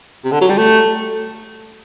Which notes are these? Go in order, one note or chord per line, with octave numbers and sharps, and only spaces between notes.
C3
D3
F#3
G3
A3